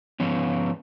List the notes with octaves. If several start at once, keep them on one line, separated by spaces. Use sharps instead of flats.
F3 B3 C#4